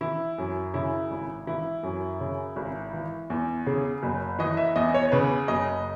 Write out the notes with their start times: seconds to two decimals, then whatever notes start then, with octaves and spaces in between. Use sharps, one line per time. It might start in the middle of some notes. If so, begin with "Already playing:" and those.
0.01 E3 E4
0.38 F#2
0.74 C#3 E4
1.11 G#1
1.47 E3 E4
1.83 F#2
2.20 C#3
2.56 G#1
2.93 E3
3.30 E2
3.66 C#3 G#4
4.03 F#1
4.39 E3 D#5
4.57 E5
4.76 E2 D#5
4.94 C#5
5.12 C#3 B4
5.48 F#1 D#5